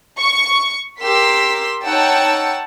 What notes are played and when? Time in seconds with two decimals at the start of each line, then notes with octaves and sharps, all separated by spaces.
0.18 C#6
1.01 G4 A#4 C6 E6 B6
1.83 D#4 C#5 F#5 G5 A5 E6